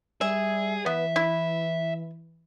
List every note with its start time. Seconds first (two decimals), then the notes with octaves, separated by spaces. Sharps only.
0.21 G3 G#4 E5
0.86 E3 B3 E5
1.16 E4